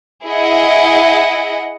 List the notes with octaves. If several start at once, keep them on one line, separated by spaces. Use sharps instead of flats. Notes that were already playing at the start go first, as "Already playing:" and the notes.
E4 G#4 D#5 F#5